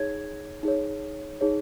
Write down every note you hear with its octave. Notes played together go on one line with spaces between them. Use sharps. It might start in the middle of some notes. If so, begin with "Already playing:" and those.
Already playing: D#4 G#4 C#5 G#6
D#4 G#4 C#5
D#4 G#4 C#5